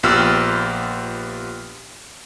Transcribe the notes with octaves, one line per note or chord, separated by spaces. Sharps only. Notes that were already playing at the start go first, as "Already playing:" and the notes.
A#1 B3 F4 G4 E6 F6